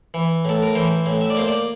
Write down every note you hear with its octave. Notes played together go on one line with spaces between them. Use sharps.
E3
A2 A4
A#4
E3 C5
A2
E5
D5
A#3 C5
D5